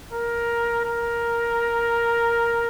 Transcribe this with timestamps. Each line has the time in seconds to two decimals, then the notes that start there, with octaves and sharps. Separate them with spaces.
0.13 A#4
0.85 A#4